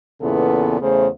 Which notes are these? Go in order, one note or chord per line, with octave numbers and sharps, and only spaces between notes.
E2 A#2 C#3 E3 B3 A4
E2 C#3 A3 C5